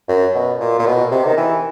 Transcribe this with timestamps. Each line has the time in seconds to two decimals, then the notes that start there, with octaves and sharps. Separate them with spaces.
0.09 F#2
0.34 B2
0.60 A#2
0.79 A#2
0.86 B2
1.11 C3
1.25 D#3
1.37 E3